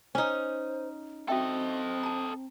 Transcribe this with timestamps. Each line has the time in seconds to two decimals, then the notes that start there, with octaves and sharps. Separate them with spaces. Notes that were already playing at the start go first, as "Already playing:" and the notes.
0.15 C#4 D#4 C5 G#5
1.28 C4 F#4 A4 D#5 E5 G5
2.03 A5 A#5